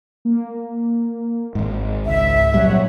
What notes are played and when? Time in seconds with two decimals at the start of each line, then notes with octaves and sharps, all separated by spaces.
0.25 A#3
1.55 G#1 G#2
2.06 C#2 E5
2.54 A#2 F#3 G3 C#5 F#5